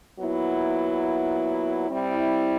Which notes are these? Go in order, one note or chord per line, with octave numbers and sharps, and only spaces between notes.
A#2 F#3 B3 E4
G3 C4 E4